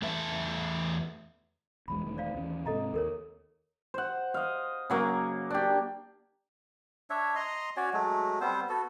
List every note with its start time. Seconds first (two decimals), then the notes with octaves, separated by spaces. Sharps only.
0.02 E2 A3 B4 E5 A5
1.88 F1 E2 G#3 B5
2.05 E1 D#3 A3
2.17 C5 D5 F5
2.35 D#2 E3 C#4
2.66 G#2 C3 A4 D#5 A#5
2.94 D#2 A4 A#4 C#5
3.94 C5 F#5
4.34 D#5 F5
4.90 C#3 F#3 A#3
5.50 D4 G4
7.10 D4 C#5 E5
7.36 D#5 A#5 C6
7.77 C#4 F#4 C#5 D5
7.93 F#3 G#3 A3
8.41 G3 B3 C4 C5
8.69 B3 F#4 A4